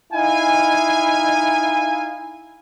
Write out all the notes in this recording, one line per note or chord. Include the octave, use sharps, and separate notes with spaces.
D#4 E4 F5 G#5